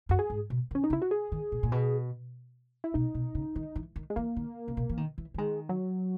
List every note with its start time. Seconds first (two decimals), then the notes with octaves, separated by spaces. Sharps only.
0.09 F#2 F#4
0.19 G#4
0.30 G#2
0.50 B2
0.71 D#3
0.75 C#4
0.84 D#4
0.90 C#3
0.93 E4
1.02 F#4
1.11 G#4
1.32 D#3
1.52 A#2
1.63 A#2
1.72 B2
2.84 E4
2.94 B2 D#4
3.15 B2
3.35 C#3
3.56 D#3
3.76 E3
3.96 D#3
4.10 G#3
4.16 E3 A#3
4.37 D#3
4.68 C#3
4.77 B2
4.89 E3
4.97 D#3
5.18 E3
5.34 E3
5.38 D#3 G#3
5.69 F#3